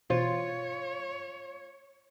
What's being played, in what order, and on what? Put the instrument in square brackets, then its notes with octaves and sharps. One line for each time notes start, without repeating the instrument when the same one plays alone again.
[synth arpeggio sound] B2 E3 C5 [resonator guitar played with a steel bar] F4 [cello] C#5